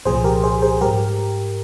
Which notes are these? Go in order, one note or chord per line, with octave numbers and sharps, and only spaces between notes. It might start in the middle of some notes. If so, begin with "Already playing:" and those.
C2 A#2 F3 G#4 C5
G4 A#4
G#4 C5
G#4 C5
G#2 G3 G4 A#4